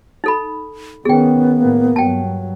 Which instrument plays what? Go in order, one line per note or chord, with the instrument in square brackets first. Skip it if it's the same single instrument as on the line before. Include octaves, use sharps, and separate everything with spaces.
[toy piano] D#4 A4 B5
[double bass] D#3 C#4 [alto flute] B3 [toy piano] G#4 G5
[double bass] A2 A#3
[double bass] G2 F#3 [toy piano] G5 A5